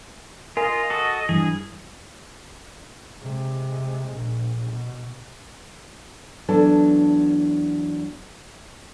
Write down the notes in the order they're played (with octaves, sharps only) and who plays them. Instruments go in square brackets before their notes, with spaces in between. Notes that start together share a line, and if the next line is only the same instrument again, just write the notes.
[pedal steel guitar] F4 [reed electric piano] A#4 G#5 [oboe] D#5
[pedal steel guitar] F#4 A4 [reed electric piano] D#6
[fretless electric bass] G2 E3 [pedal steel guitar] G#4
[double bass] C3 G#3
A#1
B2
[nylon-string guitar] E2 F#3 D4 A4 A5